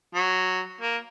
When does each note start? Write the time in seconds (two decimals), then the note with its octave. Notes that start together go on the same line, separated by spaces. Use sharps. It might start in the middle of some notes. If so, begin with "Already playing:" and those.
0.15 F#3
0.81 A#3